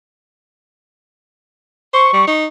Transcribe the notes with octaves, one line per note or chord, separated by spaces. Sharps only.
C5 C#6
G3
D#4